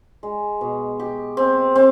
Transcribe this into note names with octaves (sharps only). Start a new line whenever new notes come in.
G#3
B2
G4
C4
C4